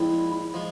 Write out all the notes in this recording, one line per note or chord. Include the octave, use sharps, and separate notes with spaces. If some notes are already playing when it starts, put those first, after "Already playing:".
Already playing: A#2 F3 G#3 C4 E4
F3 G#3